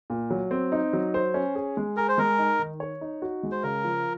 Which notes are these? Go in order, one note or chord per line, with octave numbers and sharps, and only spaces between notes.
A#2
F#3
C4
D#4
F#3
C5
C#4
G#4
G#3
G#4 A#4
C5
G#3 A#4
D#4
D#3
C#5
D#4
F#4
G#3
C5
C#3 A#4
F3